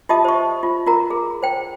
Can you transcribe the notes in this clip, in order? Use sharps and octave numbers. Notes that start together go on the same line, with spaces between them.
F4 G4 D#5 E5 A5 D#6
C5 C#6
F4
F4 F#4 A#4 A#5
G#4
C5 G5